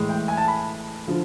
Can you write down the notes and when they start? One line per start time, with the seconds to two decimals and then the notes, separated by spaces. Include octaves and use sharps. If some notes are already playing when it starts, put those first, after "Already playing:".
Already playing: A2 E3 G#3
0.09 G5
0.28 G#5
0.37 A5
0.48 B5
1.07 D3 F3